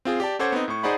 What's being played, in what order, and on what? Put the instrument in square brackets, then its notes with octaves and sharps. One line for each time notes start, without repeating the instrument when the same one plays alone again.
[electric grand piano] C4 F4 G#4
G4 D5 A5
C#4 A4 C5 F#5 D6 G#6
B3 C4 D#4
A2 C#6
D#4 G#4 C5 D5 F#5 B5